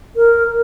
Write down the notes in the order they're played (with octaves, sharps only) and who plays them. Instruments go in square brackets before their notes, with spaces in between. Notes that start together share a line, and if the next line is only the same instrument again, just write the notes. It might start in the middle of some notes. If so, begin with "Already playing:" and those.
[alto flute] A#4